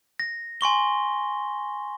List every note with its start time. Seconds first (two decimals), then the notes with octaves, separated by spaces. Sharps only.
0.19 A#6
0.61 G#5 C6 C#6 G7